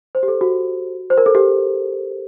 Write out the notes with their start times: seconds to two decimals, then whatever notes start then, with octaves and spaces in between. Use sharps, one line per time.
0.15 C5
0.23 G4
0.28 A4
0.41 F#4
1.10 C5
1.17 A#4
1.26 A4
1.35 G4